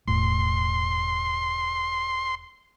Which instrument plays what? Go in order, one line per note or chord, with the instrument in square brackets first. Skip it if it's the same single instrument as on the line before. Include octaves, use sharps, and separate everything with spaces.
[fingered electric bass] E1 A2 [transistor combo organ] C6